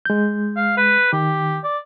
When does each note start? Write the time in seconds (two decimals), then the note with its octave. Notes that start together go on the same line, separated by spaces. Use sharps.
0.05 G#3 G6
0.56 F5
0.77 B4
1.13 D#3 G4
1.64 D5